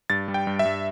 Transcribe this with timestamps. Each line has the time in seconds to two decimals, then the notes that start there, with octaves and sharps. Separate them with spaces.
0.10 G2 A6
0.28 G3
0.34 G5
0.47 G2
0.59 E5
0.65 G2